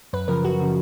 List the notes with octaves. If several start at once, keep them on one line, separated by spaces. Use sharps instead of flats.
F#2 B4
C#3 F3 A#4
F#2 F#4
C#3 F3